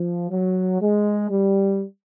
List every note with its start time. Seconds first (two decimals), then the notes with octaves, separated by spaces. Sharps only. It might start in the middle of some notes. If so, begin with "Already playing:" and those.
Already playing: F3
0.31 F#3
0.81 G#3
1.30 G3